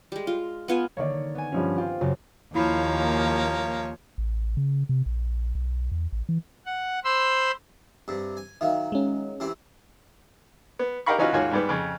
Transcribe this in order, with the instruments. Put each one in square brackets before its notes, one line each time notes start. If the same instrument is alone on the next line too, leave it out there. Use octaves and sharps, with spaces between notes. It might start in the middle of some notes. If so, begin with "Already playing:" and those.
[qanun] G3 G#3
F4
B3 F4 G#5
[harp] D3 D#3 A#3 [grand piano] C#5 D5
[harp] B3 G#5
[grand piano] G2 F3 C#4
[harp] C4 G4 [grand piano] F4
[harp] F#2 C#3 F4 [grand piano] F#3
[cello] D#2 [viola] F3 C#5 [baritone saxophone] A#3 [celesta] E4 B5
[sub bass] A1
C#3
C3
A#1
B1
E2
A1
E3
[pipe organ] F#5
C5 B5 C6 E6
[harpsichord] G2 C3
G#5
[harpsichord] D#3 F#3 [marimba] E5 F5 G5
[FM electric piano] G#3 C#4
[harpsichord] C3 E3 C4
[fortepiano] B3
D#4 G4 A#4 F5 B5 C#6
E3 C#4 D#4 F4 F#4
D#2 G#2 F4 F#4 C#5 G#5
G#2 G3 B3
F2 C#3